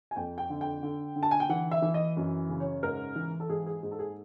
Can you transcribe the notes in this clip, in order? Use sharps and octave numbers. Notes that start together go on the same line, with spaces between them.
G#5
F2 G5
G5
D3
G5
D3
D3
A5
G#5
G5
E3 F#5
E5
E3
D#5
F#2
C#3
C#5
G#2 A#4
E3
A4
G#2 G#4
G#4
G#2 G#4
A4
G#4